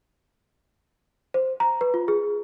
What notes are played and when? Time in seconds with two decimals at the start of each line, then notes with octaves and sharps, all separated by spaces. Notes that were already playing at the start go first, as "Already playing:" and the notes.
1.34 C5
1.60 A#5
1.81 B4
1.94 F4
2.08 G#4